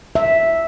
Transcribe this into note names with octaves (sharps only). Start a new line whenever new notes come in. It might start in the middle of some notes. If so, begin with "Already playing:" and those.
E5